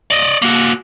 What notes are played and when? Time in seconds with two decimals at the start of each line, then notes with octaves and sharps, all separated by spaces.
0.11 D5 D#5
0.42 A#3 F#4